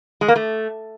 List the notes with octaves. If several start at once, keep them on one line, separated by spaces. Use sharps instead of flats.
G#3
A#3
A3